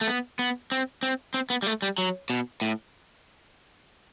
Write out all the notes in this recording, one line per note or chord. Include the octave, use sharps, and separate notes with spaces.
A3
B3
B3
C4
C4
C4
B3
G3
A3
G3
F#3
B2
A2